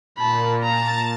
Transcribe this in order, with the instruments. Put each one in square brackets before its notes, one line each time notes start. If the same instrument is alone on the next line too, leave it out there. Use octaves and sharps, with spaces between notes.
[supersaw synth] A#2 [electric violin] A5 B5
[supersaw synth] A5 A6 [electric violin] A#5